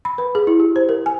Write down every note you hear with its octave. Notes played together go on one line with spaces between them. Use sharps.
B5
B4
G#4
E4
G4
C5
A#4
G#5